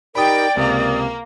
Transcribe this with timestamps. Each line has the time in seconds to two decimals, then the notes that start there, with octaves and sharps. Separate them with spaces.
0.15 D#4 G4 A#4 D5 G5 B5 D#6
0.57 C#2 C3 A#3 A#4 D#6